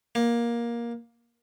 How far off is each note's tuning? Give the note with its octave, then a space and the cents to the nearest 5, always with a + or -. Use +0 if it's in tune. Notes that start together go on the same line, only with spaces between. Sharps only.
A#3 +15